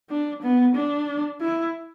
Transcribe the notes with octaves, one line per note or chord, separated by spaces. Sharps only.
D4
B3
D4
E4